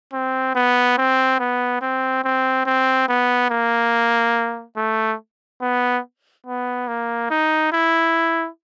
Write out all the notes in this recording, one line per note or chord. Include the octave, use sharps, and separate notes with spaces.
C4
B3
C4
B3
C4
C4
C4
B3
A#3
A3
B3
B3
A#3
D#4
E4